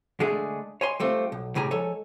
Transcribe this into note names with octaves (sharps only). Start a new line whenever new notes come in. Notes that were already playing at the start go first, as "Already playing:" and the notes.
D3 G#3 A3 D4 G#4
C#5 G#5 C6
G3 A3 C4 F4
B1
A2 C#3 G3 G#5 A#5
F3 G#3 A4 C#5 G#5